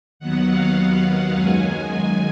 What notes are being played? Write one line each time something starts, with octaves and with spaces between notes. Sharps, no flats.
D#2 D#3 F#3 B3 F#5
F5
F5
F#5
F#2 D#3 G#3 G#5